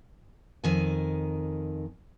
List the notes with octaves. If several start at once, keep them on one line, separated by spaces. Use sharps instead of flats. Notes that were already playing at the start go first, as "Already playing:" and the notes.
F2 D#3 G#5